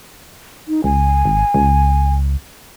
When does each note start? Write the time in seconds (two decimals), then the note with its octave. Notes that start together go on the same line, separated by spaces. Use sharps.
0.68 D#4
0.84 C#2 G#5
1.25 G#1
1.54 C#2